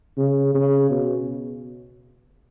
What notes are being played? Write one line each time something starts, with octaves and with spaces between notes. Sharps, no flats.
C#3
C#3
B2